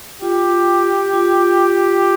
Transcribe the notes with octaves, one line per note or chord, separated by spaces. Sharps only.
F4 G4
F4